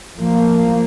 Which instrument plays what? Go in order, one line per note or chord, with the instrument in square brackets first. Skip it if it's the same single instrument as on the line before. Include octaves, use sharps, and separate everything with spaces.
[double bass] F3 A#3